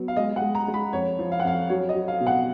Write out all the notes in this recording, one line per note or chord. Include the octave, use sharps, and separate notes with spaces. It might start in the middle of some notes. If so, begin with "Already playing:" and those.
Already playing: F#3 B3
F5
G#3 D#5
F#5
G#3
A#5
G#3
B5
F2 C#5
F3
F5
F#5
F2 F5
F#3 C#5
D#5
F#3
F5
B2
F#5